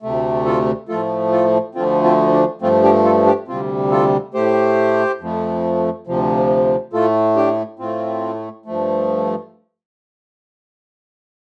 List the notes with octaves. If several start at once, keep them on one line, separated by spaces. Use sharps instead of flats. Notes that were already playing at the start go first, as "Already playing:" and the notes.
D2 C3 A3
F4 A4
A2 F3 A3 F4 A4
F4 A4
D2 D3 F3 A3 C4 F4
C4 F4
D4
G2 F3 A3 C4 F4
D4 G4
F4 A4
D4 G4
D2 C3 G3 C4 F4
F4 A4
A2 A3 G4 C5
F2 F3 A3
D2 C3 F3
A2 A3 F4 A4
D4 G4
A2 A3 C4 F4
G2 F3 A3